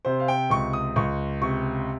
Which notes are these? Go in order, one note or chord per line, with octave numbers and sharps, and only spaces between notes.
C3 C5
F5
G5
C#2 C#6
D#6
C#2 C#6
C3 C#6